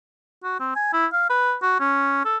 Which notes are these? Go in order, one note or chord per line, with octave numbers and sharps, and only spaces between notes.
F#4
C4
G#5
E4
F5
B4
F#4
C#4
A4